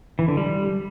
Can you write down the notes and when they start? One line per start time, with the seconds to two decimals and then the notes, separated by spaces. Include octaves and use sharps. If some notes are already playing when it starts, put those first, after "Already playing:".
0.19 E3
0.28 D3
0.37 G3